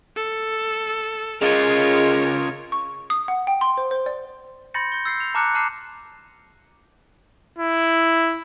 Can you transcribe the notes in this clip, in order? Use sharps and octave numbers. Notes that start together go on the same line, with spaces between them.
A4
C#3 G#3 F4 A#4 C#5
C#6
D#6
F#5
G5
C6
C5
C5
D5
B5 C6 G6 A6 A#6 C#7
G6 G7
E6 G6 A6 C7
F7
A5 A#5 D6 F6 F#6 C#7
A5 C6 D6 F6 C7 E7
E4